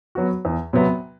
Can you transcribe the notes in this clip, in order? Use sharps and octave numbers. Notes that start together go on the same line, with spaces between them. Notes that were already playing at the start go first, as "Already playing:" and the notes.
F#3 B3 F#4
E2
C3 F#3 B3